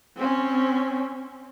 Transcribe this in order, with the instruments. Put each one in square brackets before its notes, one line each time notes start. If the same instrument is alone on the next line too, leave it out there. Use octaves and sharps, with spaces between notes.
[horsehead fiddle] C4 C#4